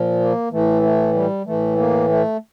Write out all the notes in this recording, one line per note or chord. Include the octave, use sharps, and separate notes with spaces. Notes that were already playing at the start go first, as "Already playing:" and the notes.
Already playing: A#2 F3
A#3
A2 E3 A3
A3
G3
A2 E3 A3
A#3
A3